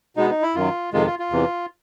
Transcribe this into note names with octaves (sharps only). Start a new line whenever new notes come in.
B2 G#3 B3 D#4
D#4
E4
F#2 D#3 F#3 F4
F2 C3 D#3 G#3 F4
F4
F4
E2 C3 E3